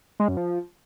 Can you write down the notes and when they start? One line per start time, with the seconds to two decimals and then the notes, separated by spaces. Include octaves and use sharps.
0.20 G#3
0.28 F#2
0.37 F3